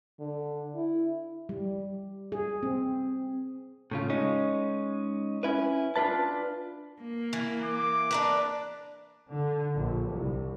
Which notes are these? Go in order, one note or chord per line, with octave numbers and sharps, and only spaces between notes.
D3
E4
G3
G#4
C4
A2 C#3 F4
G#3 C#4 D#4
C#4 E4 B4
D4 F4 B4 A5
A#3
E3
D6
D4 A#4 B4
D3
A#1
C2